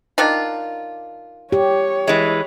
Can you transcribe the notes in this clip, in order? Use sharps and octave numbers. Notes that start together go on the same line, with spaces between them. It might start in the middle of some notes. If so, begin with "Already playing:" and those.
D#3 D4 F4
G4 C#5
E3 G#3